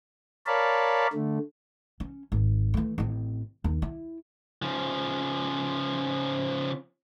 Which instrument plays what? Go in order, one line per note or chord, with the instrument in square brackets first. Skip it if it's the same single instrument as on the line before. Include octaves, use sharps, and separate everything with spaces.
[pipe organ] A#4 C#5 D5 F5 A5 B5
D3 A3
[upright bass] C#4
G#1
E3 A3
A1 C4
D#2
E4
[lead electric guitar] C#3 F3